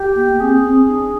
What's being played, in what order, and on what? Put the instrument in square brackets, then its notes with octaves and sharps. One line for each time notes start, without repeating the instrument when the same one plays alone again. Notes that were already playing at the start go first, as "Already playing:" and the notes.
Already playing: [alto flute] G4
[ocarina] A#3
[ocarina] C4 [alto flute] G#4
[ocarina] C4
D4